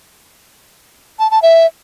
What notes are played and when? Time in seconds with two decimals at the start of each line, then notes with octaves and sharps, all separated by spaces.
1.19 A5
1.31 A5
1.42 E5